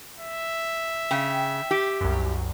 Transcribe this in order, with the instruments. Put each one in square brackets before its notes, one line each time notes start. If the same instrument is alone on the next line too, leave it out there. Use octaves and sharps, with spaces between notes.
[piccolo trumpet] E5
[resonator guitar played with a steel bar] C#3 [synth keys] G5
[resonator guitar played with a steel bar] G4
[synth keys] C2 F#2